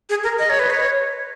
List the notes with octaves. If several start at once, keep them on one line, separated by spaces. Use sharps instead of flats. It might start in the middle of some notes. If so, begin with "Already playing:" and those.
G#4
A#4
D#5
C#5
B4
C#5